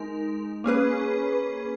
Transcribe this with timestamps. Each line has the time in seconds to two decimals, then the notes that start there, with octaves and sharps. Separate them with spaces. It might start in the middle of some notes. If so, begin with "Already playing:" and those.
Already playing: G#3 D#4 A#4
0.64 A#3 C#4 G#4 B4